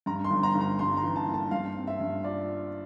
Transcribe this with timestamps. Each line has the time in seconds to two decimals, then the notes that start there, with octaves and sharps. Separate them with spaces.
0.06 G2 A#5
0.24 C6
0.31 G1
0.43 A#5
0.55 G1
0.61 A#5
0.79 G2 C6
0.97 A#5
1.03 E3
1.16 A5
1.27 A#3
1.34 A5
1.51 G2 F5
1.76 C4
1.87 E5
2.00 G2
2.24 F4 D5